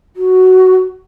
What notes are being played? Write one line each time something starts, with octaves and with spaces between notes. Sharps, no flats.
F#4